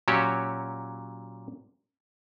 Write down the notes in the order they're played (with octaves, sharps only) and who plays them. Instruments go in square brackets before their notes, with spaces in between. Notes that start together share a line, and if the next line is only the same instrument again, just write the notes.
[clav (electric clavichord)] A#2 F#3 C#4 F#4 G4 C#5